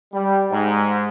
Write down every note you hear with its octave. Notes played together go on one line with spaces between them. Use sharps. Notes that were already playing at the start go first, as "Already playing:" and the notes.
G3
G#2